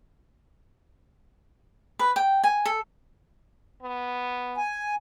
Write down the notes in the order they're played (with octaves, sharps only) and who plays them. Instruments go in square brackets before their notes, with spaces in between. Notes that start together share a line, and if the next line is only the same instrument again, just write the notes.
[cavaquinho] B4
G5
G#5
A4
[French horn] B3
[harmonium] G#5